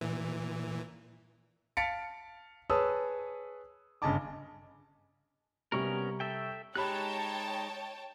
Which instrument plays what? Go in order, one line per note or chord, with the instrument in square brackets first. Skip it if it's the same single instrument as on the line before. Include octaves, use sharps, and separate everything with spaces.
[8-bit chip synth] A#2 E3
[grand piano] F5 A5 A6 B6 C#7 D7
G#4 B4 C#5 A5 D#6 E6
G1 C#3 D#5 G#5 A5 D6
[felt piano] C3 G3 C#6 [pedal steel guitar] B3 C#4 A#4
[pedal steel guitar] A4 E5 G5
[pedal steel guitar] G#3 D#4 F#6 [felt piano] G4 B5 [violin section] C#5 G5 A5